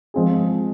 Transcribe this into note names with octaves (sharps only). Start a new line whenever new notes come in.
F3 G#3 C4 F4 G#4